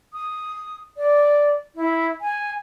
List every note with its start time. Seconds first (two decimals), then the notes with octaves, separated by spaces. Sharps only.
0.13 D#6
0.97 D5
1.75 E4
2.21 G#5